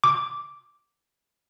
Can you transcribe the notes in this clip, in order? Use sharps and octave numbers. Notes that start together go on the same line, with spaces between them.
D6